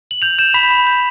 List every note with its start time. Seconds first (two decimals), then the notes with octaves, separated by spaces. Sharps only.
0.11 F#7
0.22 G6 F7
0.39 G6 E7
0.54 B5 B6
0.71 B5
0.87 G6